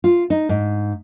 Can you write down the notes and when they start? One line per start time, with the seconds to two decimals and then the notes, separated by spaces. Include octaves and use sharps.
0.04 F4
0.30 D#4
0.49 G#2